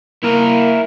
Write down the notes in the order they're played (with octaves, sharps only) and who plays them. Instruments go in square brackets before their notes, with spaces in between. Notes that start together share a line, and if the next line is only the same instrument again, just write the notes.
[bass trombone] A#3 [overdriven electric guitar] E4 A#4